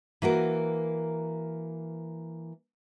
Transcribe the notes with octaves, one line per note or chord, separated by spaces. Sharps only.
E3 A#3 F#4 A#4